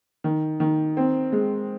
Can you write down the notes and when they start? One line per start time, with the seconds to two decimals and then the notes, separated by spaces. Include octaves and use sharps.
0.24 D#3
0.60 D#3
0.97 C4
1.32 G#3